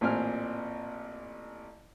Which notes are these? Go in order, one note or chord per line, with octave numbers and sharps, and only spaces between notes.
A1 A#2 C4 G#5 F6